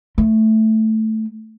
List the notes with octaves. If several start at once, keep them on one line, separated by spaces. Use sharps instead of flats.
A3